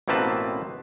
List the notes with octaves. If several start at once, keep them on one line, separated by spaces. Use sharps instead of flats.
A1 B2 A#3 C4 B4 A5